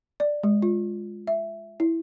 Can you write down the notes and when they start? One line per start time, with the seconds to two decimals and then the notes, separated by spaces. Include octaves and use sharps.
0.20 D5
0.43 G#3
0.62 F4
1.27 E5
1.80 E4